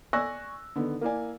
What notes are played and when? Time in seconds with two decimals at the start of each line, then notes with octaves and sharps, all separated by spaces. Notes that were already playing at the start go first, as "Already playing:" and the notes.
0.13 D5 G#5 C#6 E6 F#6 A#6
0.75 D3 D#3 B3
1.01 A#3 E4 D5 G#5